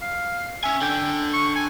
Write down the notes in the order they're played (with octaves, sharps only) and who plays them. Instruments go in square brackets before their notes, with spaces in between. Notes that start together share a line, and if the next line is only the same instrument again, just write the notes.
[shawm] F5
[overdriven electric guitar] C#4 G#5 [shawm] E5
[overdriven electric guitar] D3 [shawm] G5
[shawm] C#6
G#5